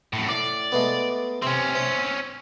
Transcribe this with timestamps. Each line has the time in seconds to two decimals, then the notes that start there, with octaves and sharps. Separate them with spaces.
0.13 F#2 A2
0.29 A2 D5
0.72 G#3 A3 B3
1.42 C3 C4 C#4
1.75 C5